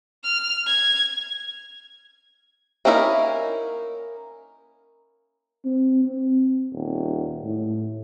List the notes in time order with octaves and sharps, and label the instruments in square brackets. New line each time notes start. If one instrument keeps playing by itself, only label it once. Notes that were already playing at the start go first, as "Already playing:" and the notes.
[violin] F6
G#6
[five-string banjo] A#3 C#4 D#4 E4 A#4
[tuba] C4
C4
D#1
A2